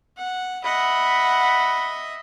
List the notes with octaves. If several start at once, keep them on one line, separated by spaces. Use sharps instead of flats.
F#5
D#5 E5 F#5 B5